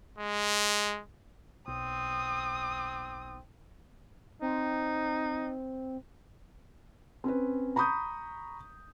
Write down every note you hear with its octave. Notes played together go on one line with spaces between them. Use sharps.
G#3
B1 C4 D#6
C4 D#4
C4 C#4 B4
A#5 B5 C#6 D#6 G6